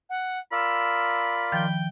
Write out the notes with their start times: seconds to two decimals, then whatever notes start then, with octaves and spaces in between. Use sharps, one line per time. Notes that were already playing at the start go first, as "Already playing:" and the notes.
0.10 F#5
0.52 F4 A#4 D5 B5 E6
1.52 D#3 F3 G5